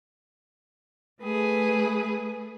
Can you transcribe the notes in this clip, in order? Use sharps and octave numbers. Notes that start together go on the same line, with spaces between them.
A3 G#4 B4